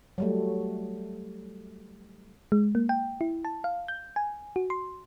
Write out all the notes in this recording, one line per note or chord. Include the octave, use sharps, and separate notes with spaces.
F#3 G3 A3
G#3
A#3
G5
E4
A5
F5
G6
G#5
F#4
C6